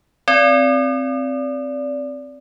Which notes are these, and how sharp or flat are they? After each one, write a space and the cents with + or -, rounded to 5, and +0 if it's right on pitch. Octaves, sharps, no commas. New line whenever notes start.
C4 +0 D5 -20